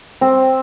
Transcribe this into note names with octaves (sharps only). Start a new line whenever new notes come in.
C4